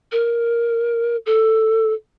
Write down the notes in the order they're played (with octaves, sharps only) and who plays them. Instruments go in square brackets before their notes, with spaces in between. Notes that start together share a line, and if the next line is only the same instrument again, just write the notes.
[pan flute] A#4
A4